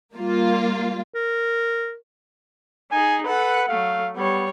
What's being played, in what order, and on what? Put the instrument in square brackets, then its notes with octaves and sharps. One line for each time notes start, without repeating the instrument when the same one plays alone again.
[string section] G3 A#3 F4
[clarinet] A#4
[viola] D#4 G#4 [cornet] G#5
[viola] A4 F#5 [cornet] B4
[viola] F#3 A3 [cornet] F5
[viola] G3 C#5 [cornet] B3